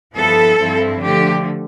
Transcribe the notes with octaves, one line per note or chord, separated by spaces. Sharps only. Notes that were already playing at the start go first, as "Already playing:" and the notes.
G2 F3 B3 E4 A4
G2 F3 C4 E4
D3 F3 A3 G4